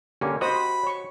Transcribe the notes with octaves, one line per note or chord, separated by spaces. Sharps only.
D3 A#3 C#4 G4
F#4 C5 D#5 B5 D#6
C#5 C#6